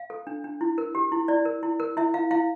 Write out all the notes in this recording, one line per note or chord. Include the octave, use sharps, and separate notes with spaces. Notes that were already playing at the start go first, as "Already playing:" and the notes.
Already playing: F5
A4
D4
D4
E4
A#4
G4
E4
E4 D5
A#4
E4
A#4
E4 E5
E4 F5
E4 F5